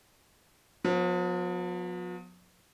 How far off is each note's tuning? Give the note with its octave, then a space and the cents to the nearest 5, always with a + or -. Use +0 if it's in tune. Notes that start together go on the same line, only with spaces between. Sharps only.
F3 +45 B3 +0